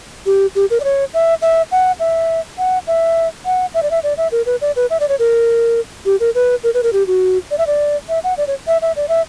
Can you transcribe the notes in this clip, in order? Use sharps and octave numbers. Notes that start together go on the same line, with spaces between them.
G4
G4
A#4
D5
C#5
E5
E5
F#5
E5
F#5
E5
F#5
E5
D5
E5
D5
E5
A#4
B4
D5
B4
E5
D5
C#5
A#4
G4
A#4
B4
A#4
B4
A#4
G4
F#4
D5
E5
D5
E5
F#5
D5
C#5
E5
E5
D5
E5